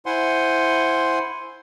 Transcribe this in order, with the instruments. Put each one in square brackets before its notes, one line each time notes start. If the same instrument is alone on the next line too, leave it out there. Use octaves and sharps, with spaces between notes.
[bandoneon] E4 C5 F#5 G#5 C6